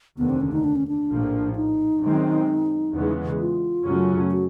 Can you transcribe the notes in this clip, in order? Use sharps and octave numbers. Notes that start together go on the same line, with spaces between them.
F1 D#2 D3 B3
C4
C#4
D#4
D4
C#4
D4
A#1 A2 F3 A#3
D#4
F#2 D#3 G#3 C4
E2 C#3 E3 G#3 B3
F4
F#2 C#3 F#3 A3 C#4
F#4